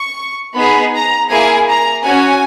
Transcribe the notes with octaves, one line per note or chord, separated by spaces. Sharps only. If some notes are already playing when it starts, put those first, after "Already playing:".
Already playing: C#6
B3 D#4 G#4 B5
A#5
A#3 E4 G#4 G#5
A#5
C#4 F#4 G#5